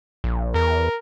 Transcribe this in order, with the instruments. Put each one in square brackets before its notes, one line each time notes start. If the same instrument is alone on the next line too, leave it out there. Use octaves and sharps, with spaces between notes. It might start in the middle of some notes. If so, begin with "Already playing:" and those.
[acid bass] A#1
[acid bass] E2 [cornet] A#4